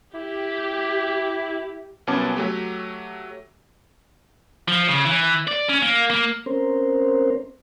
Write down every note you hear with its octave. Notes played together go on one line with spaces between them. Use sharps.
E4 G4
C2 F#3 B3 C#4 A5 D6
F#3 A3 G4
F3
C#3
E3
D5
C#4
A#3
A#3
C4 C#4 A#4 C5